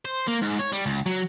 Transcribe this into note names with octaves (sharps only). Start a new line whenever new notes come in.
C5
A#3
G#2
C#5
G3
C#2
F#3